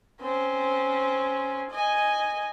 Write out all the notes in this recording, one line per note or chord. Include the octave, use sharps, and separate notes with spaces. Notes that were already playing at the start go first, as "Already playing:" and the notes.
C4 C#4
D#5 G#5